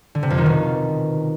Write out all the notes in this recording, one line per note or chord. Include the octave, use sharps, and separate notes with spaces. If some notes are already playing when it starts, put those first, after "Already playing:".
D3
C3
F2
D#3
B2